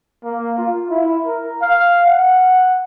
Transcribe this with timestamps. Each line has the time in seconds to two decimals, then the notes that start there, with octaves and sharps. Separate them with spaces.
0.24 A#3
0.58 F4
0.91 E4
1.26 A#4
1.61 F5
2.06 F#5